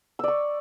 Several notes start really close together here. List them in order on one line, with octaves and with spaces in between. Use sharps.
E6 D5 C#6